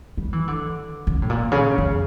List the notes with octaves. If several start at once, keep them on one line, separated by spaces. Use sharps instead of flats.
G3
E3
D3
C#3
A2
A#2
C#3
F2